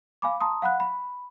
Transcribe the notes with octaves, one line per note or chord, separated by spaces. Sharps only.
F5 G#5 B5 D6
A5 A#5 C6 D#6
F5 F#5 B5 F#6
B5